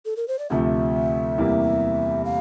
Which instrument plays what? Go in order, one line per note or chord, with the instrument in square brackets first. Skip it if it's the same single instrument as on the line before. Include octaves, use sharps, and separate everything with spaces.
[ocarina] A4
A#4
C5
D5
[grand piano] D2 C3 F3 A3 [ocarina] E5
[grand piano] E2 C3 G3 A#3 E4
[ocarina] F5